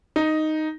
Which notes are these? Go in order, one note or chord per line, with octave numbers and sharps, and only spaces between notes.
D#4